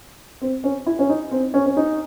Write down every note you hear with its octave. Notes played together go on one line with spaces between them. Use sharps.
C4
C#4
E4
C#4
D#4
C4
C#4
C#4
D#4